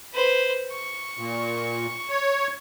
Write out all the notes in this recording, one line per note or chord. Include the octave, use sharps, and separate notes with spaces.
B4 C5
C#6
A#2
C#5